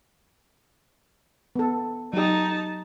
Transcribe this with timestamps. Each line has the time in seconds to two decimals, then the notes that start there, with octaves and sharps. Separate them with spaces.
1.56 B3 A4
2.13 F#3 D#4 G4 A5